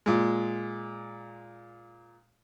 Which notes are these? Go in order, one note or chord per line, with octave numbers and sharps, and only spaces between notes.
A#2 G#3